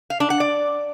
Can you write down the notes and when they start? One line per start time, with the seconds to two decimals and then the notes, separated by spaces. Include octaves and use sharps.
0.10 F5
0.20 D4
0.30 F#5
0.40 D5